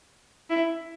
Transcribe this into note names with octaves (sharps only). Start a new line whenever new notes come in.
E4